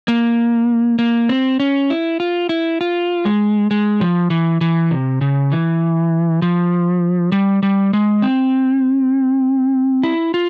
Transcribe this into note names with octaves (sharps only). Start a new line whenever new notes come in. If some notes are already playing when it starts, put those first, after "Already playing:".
A#3
A#3
C4
C#4
E4
F4
E4
F4
G#3
G#3
F3
E3
E3
C3
C#3
E3
F3
G3
G3
G#3
C4
E4
F4